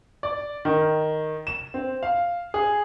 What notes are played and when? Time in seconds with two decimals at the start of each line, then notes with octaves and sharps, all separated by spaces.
0.23 D5
0.65 D#3
1.47 E7
1.74 C4
2.03 F5
2.54 G#4